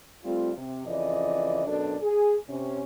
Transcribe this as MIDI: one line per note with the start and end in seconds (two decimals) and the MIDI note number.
0.24 0.50 55
0.24 0.50 57
0.24 0.50 60
0.24 0.50 65
0.56 0.84 48
0.86 1.63 41
0.86 1.63 49
0.86 1.63 52
0.86 1.63 74
0.86 1.63 75
1.66 1.95 42
1.66 1.95 47
1.66 1.95 62
1.66 1.95 69
1.66 1.95 74
2.02 2.35 68
2.48 2.82 48
2.48 2.82 61